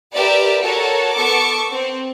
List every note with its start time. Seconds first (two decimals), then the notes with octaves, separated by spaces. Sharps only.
0.14 G4 A#4 B4 D5 E5
0.61 F#4 A4 A#4 C#5
1.13 B3 A4 C#6 D6
1.69 C4